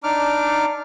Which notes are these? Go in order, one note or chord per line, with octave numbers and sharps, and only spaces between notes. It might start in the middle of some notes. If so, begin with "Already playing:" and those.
D4 D#4 D6 F6